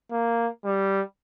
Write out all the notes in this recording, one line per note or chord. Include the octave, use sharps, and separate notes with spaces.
A#3
G3